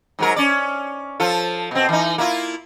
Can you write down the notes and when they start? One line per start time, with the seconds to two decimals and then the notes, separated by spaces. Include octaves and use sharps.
0.19 G#2 F#3 A#4
0.36 C#4 D5
1.20 F3 F4 A4
1.71 B2 C4
1.89 E3 D#4
2.18 A#3 E4 F4